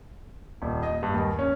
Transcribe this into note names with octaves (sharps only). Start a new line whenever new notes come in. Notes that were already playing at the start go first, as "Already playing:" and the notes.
D#1
D#5
G2
D#2
C#4